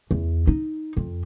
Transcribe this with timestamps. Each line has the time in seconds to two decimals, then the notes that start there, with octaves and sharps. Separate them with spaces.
0.11 E2
0.47 D#4
0.97 F2